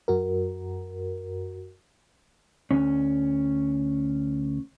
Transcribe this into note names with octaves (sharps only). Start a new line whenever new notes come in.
F#2 F#4 A#4
D2 C#4